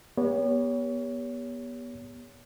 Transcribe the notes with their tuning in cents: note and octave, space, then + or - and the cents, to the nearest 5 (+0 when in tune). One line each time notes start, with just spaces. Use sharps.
B3 -30 G4 +30 C#5 +25